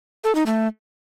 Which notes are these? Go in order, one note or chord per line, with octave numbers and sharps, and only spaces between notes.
A4
D#4
A3